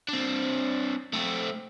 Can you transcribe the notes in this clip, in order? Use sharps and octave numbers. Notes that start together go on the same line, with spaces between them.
C4 D4
A3 C4